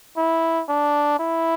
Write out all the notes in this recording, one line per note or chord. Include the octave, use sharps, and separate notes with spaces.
E4
D4
E4